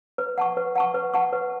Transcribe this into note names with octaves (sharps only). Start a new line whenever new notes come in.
B4
F#5 A5 C#6
B4
F#5 A5 C#6
B4
F#5 A5 C#6
B4